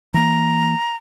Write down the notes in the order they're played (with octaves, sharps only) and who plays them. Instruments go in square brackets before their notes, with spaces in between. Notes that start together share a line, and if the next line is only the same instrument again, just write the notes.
[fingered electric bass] E3 A#3 [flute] A#5